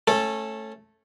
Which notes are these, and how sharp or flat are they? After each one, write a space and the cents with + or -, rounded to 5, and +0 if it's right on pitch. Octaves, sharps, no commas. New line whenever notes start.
A3 +0 C#4 -20 A4 +0